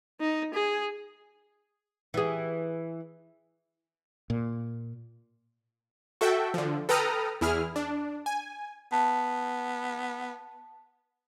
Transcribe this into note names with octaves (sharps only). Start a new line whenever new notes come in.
D#4
G#4
E3 G#4
A#2
F#4 A4 E5 G5
D3 F3
A4 B4 G5 A#5 D#6 F6
E2 E4 G#4 F6
D4
G#5
B3 A5